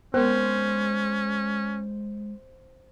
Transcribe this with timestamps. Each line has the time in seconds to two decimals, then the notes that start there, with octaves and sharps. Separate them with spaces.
0.14 G#3 B3 C#4 A#4 C5